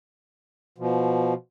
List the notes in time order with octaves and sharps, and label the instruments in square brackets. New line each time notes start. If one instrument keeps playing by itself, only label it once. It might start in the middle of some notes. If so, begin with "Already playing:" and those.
[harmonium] B2 F3